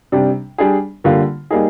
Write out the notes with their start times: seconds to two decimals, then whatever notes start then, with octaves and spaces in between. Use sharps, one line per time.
0.12 C3 G3 D4
0.58 G3 D4 G#4
1.04 D3 G3 A#3 F4
1.50 G3 A#3 D#4 G#4